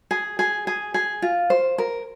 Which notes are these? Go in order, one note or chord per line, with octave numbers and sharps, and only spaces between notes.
G#4
G#4
G#4
G#4
F4
C5
A#4